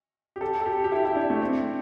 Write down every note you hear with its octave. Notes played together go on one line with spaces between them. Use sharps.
G4
A4
A4
G4
G4
E4
E4
D4
A3
C4